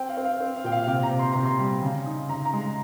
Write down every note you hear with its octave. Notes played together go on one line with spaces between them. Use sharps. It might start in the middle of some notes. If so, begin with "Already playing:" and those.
Already playing: C4 G5
F5
C4
F5
C4
F5
A#2 G5
F5
F5
C3 G5
A#5
C3
C6
C3 A#5
C6
G3
C#3
D#4
C#3 A#5
A#5
G#3
A#5